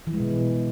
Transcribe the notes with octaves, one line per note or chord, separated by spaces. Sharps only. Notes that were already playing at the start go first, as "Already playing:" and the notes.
E3
G#3
B2